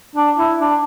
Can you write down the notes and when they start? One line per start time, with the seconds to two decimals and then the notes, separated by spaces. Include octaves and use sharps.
0.16 D4
0.38 E4
0.60 D4